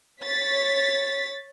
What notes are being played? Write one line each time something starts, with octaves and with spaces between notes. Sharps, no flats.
C#5 A6 B6